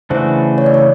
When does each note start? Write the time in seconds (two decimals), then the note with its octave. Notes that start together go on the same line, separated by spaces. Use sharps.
0.10 C#3 E3 A3 D4 F#4 C5
0.58 C#5
0.66 D5
0.74 C#5